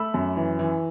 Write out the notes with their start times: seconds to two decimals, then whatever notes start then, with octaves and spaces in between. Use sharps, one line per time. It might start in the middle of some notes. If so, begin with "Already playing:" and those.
Already playing: A3 B5 E6
0.14 F#2
0.37 E3
0.59 E3